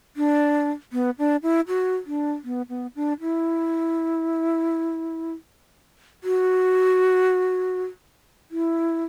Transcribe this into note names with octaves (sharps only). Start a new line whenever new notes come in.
D4
B3
D4
E4
F#4
D4
B3
B3
D4
E4
F#4
E4